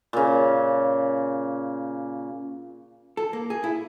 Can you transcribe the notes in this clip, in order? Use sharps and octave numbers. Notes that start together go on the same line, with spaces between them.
A#2 C#3
A4
A#3
G#4
E4